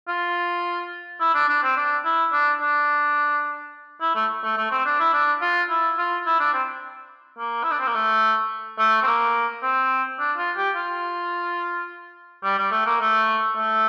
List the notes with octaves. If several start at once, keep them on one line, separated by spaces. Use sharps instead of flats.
F4
E4
D4
D4
C4
D4
E4
D4
D4
E4
A3
A3
A3
C4
D4
E4
D4
F4
E4
F4
E4
D4
C4
A#3
E4
D4
C4
A#3
A3
A3
C4
A#3
C4
D4
F4
G4
F4
G3
G3
A3
A#3
A3
A3